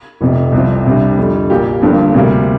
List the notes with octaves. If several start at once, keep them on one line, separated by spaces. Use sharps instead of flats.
F1 F2 C3
C2 C3 F3
C2 C3 G3 D4
F2 D3 G3
A#1 A#2 A#3 G4
G1 G2 D3 F3 A#3
D2 C3 G3 A#3